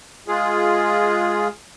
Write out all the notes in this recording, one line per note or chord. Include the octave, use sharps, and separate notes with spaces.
G#3 F4 G#4